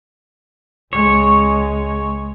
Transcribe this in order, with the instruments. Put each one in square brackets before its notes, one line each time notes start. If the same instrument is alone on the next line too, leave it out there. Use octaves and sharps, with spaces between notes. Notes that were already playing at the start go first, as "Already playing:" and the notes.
[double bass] C#2 G#3 [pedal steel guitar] C#5